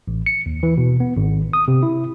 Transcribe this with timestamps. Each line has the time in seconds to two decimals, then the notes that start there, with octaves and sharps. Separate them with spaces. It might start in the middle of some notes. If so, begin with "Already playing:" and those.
0.08 A1
0.26 C#7
0.46 D#2
0.63 E3
0.78 B2
1.00 B3
1.16 G#1
1.53 D#6
1.68 C3
1.83 E4